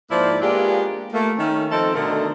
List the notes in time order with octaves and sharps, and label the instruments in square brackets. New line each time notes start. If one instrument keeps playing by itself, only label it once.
[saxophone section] G#2 F3 A#3 E4 C5 D5
G#3 A#3 B3 D4 F4 G4
A3 A#3
D#3 A3 C#4
F3 C4 D#4 A4
B2 D3 D#3 A3 A#4 D#5